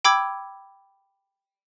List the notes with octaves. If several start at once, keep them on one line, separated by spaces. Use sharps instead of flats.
G5 B5 D6 E6 G#6